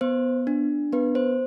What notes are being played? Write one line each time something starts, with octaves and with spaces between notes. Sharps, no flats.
B3 C5
D4
B3 B4
C5